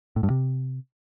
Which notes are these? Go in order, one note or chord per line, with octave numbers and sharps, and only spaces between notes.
A2
G2
C3